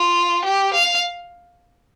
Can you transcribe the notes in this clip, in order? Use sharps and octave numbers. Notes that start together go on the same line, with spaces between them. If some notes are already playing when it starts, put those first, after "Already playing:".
Already playing: F4
G4
F5